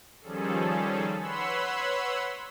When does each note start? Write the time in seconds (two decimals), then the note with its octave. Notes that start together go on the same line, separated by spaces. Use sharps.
0.21 D#3 F3 G3 C#4 G#4 A4
1.17 B4 C#5 F#5 B5 C6 E6